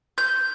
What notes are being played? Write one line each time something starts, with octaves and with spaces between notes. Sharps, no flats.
G6